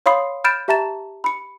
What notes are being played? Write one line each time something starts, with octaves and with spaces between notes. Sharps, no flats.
C#5 F5 B5 C6 D#6 C7
B5 F6 G6 A6 D7 E7
G4 E5 A5 A#5 A6 E7
B5 C#7